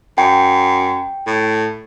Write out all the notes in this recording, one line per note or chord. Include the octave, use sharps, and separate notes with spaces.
F#2 G5
A2